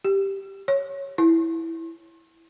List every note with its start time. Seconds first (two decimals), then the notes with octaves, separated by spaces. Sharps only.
0.05 G4
0.68 C#5
1.18 E4